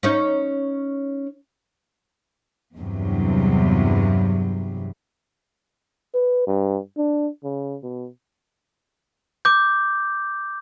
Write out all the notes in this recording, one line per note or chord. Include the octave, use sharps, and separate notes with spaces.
C#4 D#4 C#5
E2 G2 C3 F#3
B4
G2
D4
C#3
B2
D6 G6